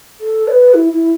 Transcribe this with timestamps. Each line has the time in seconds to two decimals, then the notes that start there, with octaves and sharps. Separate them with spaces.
0.21 A4
0.48 D5
0.51 B4
0.74 E4
0.92 E4